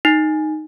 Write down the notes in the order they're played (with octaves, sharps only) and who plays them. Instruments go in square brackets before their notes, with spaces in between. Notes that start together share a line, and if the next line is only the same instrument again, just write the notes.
[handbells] D#4